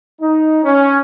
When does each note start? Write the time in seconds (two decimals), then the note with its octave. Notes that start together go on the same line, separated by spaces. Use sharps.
0.21 D#4
0.64 C#4